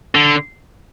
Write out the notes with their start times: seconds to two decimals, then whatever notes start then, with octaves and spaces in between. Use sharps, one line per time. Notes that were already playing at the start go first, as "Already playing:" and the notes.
0.15 D3